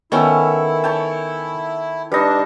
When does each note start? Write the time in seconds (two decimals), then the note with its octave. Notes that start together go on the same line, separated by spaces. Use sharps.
0.12 D#3 B3 C#4 E4 A4 C#5 G#5 C#6
0.84 C#5 G5 A5
2.12 G3 D4 D#4 B4 A#6